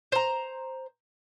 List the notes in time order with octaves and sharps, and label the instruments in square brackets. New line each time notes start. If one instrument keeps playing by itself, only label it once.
[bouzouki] C5 A#5